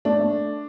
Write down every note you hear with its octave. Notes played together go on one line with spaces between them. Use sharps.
A3 D4
A3